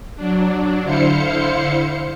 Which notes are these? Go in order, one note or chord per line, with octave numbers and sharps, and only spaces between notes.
F#3 D4
D3 E4 C5 F5 C#7